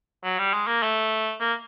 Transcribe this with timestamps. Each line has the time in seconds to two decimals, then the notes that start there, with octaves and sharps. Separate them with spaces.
0.24 F#3
0.39 G3
0.53 G#3
0.67 A#3
0.83 A3
1.40 A#3